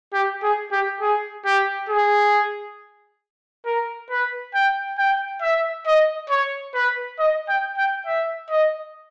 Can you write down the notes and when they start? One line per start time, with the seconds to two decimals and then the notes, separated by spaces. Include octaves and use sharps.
0.13 G4
0.43 G#4
0.72 G4
1.00 G#4
1.46 G4
1.89 G#4
3.65 A#4
4.10 B4
4.54 G5
4.98 G5
5.41 E5
5.86 D#5
6.30 C#5
6.74 B4
7.19 D#5
7.48 G5
7.78 G5
8.06 E5
8.50 D#5